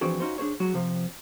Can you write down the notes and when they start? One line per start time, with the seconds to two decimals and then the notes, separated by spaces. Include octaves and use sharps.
0.01 E3 F3 C4 D4 F#4 G#4
0.20 C#4 D#4 F4 F#4 C5
0.38 D4 G#4 C5 C#5
0.60 F#3 G#3 F#4
0.74 C3 F3